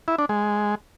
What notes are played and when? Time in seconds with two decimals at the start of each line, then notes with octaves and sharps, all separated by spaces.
0.08 E4
0.19 D4
0.29 G#3